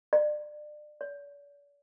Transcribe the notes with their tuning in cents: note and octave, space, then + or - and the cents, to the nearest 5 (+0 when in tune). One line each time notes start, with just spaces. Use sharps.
D5 +30
D5 -45